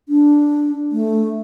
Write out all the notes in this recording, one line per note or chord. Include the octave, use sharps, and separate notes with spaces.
D4
A3